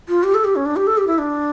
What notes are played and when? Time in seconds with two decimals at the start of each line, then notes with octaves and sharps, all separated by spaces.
0.08 F4
0.23 G4
0.34 A4
0.44 G4
0.56 C#4
0.66 D4
0.76 G4
0.87 A4
0.98 G4
1.07 E4
1.18 D4